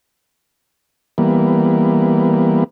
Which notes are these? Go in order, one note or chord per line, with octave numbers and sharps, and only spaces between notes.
E3 G3 A#3 B3